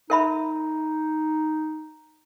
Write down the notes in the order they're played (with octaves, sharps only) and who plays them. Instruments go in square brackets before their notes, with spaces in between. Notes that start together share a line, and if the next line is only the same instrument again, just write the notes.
[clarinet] D#4 [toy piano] A#4 E5 B5